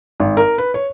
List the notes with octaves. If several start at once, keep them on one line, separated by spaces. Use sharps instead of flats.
G#1
A#4
B4
C#5